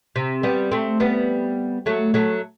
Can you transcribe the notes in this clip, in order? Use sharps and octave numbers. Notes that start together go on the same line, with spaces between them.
C3
G3 B3
A3 C4
G3 B3
F#3 A3
F#3 A3